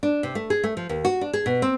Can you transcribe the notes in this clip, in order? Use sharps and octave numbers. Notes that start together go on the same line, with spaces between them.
D4
C3
A3
G#4
A3
F3
D#2
F#4
D4
G#4
B2
C4